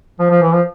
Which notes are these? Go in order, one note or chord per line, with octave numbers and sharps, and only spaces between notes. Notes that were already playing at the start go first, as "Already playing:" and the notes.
F3
F3
E3
F3